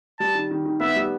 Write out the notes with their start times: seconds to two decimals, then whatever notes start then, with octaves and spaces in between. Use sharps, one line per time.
0.20 G3 A5
0.35 D#3
0.51 D#3
0.65 D#3
0.80 B3 E5
0.96 G3